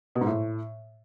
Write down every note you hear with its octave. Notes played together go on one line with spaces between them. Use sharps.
B2
G#2
A2